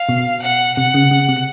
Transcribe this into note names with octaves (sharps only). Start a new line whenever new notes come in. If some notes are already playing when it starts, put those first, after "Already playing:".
Already playing: F5
B2
F#5
C3 F#5
C#3
C#3
C3